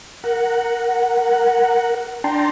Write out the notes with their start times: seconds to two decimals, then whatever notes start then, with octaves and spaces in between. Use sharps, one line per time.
0.24 A#4 F#5
2.24 D4 G5 A5 A#5 C6